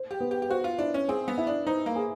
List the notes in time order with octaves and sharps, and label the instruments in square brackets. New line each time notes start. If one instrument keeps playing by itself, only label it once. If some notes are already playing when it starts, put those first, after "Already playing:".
Already playing: [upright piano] C5
[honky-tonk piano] G4
[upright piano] B3
[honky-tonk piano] G4
G4
[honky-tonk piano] F#4 [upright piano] C5
[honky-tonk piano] F4
[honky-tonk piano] D4 [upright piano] E4
[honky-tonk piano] C#4
[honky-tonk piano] C4 [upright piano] G#4
[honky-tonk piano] B3
[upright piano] E4
[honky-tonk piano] D4
[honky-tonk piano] D#4 [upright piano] C5
[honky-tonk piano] A#3
[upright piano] G#4